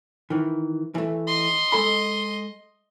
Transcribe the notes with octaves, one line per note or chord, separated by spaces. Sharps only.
D#3 E3
E3 A3
D#5 C6
G#3 A4 B5